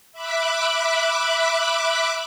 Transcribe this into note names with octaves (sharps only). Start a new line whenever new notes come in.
E5 B5 D6 F#6